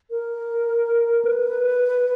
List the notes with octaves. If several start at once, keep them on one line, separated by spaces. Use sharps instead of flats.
A#4
B4